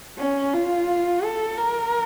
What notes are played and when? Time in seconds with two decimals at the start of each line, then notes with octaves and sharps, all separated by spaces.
0.18 C#4
0.54 F4
1.24 A4
1.58 A#4